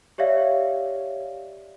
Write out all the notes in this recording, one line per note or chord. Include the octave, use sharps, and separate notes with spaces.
G4 C#5 D5 E5 F5